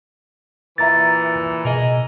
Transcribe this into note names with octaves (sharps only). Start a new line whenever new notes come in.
A#2 E3 E5 A#5 A6
B2 G#4 A#4 D#5